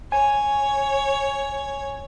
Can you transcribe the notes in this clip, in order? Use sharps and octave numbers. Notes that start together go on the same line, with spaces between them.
C#5 G#5